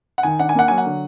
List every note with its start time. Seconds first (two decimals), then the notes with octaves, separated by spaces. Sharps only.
0.18 F#5
0.23 D#3 G#5
0.39 D4 F#5
0.49 G#5
0.55 A#3 F#5
0.68 F#3 G#5
0.78 F#5
0.86 D3